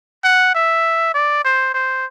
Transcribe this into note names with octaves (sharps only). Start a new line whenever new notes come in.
F#5
E5
D5
C5
C5